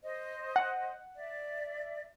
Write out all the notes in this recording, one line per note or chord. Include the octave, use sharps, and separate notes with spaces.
C5 D#5
F#5
D5 E5